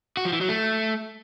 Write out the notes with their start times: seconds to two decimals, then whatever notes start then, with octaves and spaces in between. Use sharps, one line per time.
0.17 F#4
0.25 F3
0.33 E3
0.41 F#3
0.49 A3